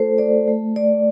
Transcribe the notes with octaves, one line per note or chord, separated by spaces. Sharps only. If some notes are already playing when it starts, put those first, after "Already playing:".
Already playing: A3 F4 A4 C5
A3 D5
A3
A3 D5